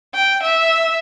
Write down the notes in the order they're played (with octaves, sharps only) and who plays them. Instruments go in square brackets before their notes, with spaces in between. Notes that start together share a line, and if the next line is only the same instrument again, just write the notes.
[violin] G5
E5